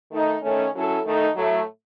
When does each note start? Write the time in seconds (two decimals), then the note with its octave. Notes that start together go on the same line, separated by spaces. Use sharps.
0.11 D#3 A3 D#4
0.42 D#3 A3 C#4
0.74 F#3 C#4 E4 A4
1.05 D#3 A3 D#4 A4
1.36 A2 F#3 A3